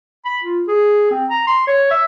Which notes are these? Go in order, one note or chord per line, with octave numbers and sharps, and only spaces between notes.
B5
F4
G#4
C4
A#5
C6
C#5
E5